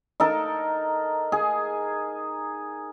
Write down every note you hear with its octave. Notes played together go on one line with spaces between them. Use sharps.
D#4 A4 A#4
G#4